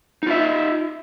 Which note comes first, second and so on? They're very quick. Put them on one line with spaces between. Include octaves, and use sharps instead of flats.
D#4 F4 E5